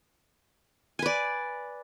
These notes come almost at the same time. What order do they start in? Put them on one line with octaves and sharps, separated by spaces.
G#5 B4 D5